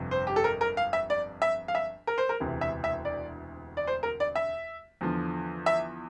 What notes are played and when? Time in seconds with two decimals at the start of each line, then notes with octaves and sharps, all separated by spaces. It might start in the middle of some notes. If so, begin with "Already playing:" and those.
Already playing: G1 F2 C3
0.11 C5
0.27 G4
0.36 A4
0.44 A#4
0.61 A#4
0.77 F5
0.93 E5
1.10 D5
1.42 E5
1.68 F5
1.75 E5
2.07 A#4
2.18 C5
2.29 A#4
2.40 E1 D2 C3 E3
2.61 E5
2.84 E5
3.05 D5
3.77 D5
3.87 C5
4.03 A#4
4.20 D5
4.35 E5
5.01 E2 D3 F3
5.66 E5